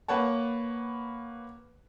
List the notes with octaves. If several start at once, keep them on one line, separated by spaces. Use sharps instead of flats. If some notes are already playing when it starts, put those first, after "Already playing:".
A#3 B4 C#5 F#5 A5